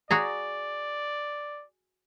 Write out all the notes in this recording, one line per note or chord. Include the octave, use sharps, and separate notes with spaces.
F#4 G#4 D5 A#5